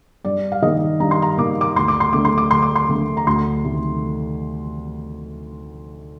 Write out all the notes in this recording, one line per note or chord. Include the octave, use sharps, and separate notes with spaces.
G2 D5
F5
D#3 A#3 D#5
G2 A#5
C6
A#5
D#3 A#3 D6
D6
D2 C6
D6
C6
D3 A3 D6
C6
D6
D2 C6
D6
C6
D3 A3
A#5
D2 C6
C3 D#3 A3